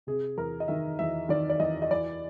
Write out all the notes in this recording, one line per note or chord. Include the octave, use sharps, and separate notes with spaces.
C3 G#4
E2 A#4
D#5
D#3 E5
E2 E5
D#3 D5
D5
E2 D#5
D#5
E3 D5